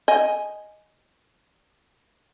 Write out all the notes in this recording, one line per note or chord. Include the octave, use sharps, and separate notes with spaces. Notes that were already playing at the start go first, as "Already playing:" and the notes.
D#5 G#5